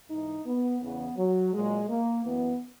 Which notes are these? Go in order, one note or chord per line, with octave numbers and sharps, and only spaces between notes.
G#2 E3 D#4
B3
E2 C#3 E3 B3
F#3
A#2 F#3 G#3
A#3
F#2 E3 B3